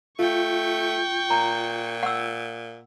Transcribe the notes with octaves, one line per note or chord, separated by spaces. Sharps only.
A3 F4 G5 C#6
A#2 A#5
F#5 E6